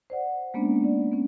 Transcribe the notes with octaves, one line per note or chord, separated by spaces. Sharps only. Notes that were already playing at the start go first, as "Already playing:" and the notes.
C5 D5 F#5
G#3 A#3 B3 C#4 D4
D5
B3 C#4